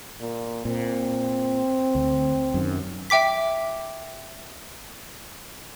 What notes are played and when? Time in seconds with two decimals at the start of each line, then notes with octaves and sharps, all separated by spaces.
0.21 A#2
0.65 A#2 C4
1.95 D2
2.54 F#2 D#3
3.10 E5 G5 D6 B6